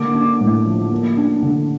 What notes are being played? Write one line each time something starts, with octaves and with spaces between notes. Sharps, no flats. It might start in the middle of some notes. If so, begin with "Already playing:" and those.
Already playing: D3 A#3 D6
D4
A2
F3
A#3
D4
D3